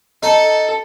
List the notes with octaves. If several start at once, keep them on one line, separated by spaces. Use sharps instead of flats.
D#4 A4